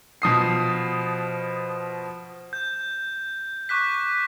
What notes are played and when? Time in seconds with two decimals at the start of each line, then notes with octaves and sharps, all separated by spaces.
0.22 B2 F3 D#6 C7
2.53 G6
3.69 C#6 D6 F#6 B6